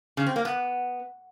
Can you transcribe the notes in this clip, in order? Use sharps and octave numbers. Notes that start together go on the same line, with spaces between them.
C#3
C4
A#3
B3